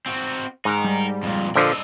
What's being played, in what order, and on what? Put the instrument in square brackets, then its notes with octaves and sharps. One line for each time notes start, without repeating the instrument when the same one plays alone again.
[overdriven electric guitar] C4 F#4
[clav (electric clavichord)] G#2 [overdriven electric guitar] D#4 A#4
[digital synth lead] G3
[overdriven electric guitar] F2 A#2
[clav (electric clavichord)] A#1 D3 F3 [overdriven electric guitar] D4 D#5 [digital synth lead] E6